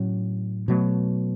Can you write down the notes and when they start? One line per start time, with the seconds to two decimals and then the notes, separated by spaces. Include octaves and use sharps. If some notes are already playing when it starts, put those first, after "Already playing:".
Already playing: A2 F#3 C#4
0.68 B2 F#3 A3